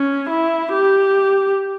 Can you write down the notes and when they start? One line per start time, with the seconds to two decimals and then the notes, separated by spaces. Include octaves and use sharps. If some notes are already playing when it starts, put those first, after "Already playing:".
Already playing: C#4
0.30 E4
0.73 G4